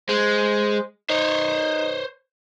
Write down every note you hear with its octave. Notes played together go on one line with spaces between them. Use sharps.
G#3 C5
D#4 C5 C#5